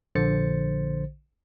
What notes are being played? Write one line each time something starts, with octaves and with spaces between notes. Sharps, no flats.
A#1 D3 C5 A6 C#7